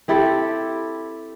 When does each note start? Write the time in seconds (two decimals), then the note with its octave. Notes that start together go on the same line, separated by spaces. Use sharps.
0.08 C4 E4 G4 A4